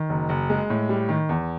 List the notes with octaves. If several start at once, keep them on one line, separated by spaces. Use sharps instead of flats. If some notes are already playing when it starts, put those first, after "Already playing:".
Already playing: D#3
F#1
F#1
G#3
A2
G3
D#3
E2